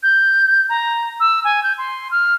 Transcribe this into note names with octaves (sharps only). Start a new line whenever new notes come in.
G6
A#5
E6
G#5
G6
C6
F6